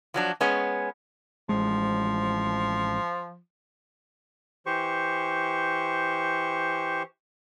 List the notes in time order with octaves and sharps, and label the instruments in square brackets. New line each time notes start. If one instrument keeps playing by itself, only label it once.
[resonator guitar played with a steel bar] F3 F#3 D4
G#3 B3 C#4
[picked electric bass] A1 G#3 [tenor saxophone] F3
[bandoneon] E3 G4 C5 C#6